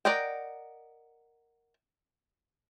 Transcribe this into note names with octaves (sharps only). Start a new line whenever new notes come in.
A#4 D5 D#5 F#5 G5